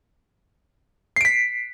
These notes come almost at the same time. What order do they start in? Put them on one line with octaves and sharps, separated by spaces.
C7 D7 B6